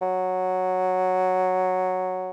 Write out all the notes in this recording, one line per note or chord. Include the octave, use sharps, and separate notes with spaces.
F#3